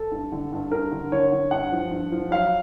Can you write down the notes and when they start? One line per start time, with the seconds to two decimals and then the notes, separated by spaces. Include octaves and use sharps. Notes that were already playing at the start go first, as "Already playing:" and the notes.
Already playing: A4
0.12 G2
0.32 D3
0.52 G2
0.71 G2 A#4
0.92 D3
1.12 D3 C#5
1.32 D3
1.51 G2 F#5
1.72 F3
1.91 G2
2.12 F3
2.31 F#3 F5